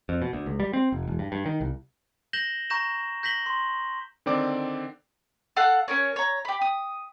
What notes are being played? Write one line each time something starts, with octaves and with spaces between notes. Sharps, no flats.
F2
B2
D2
C#2
G3
C4
F1
E1
G2
G2
D#3
C2
G6 A#6 E7 F#7 G7
A#5 C#6 G6 A#6 E7
G6 A#6 B6 F#7 G7
C6
D3 D#3 C4 D5 D6
A4 F5 F#5 F#6
C#4 A#4 C#5
C#5 A#5
G4 B5
D#6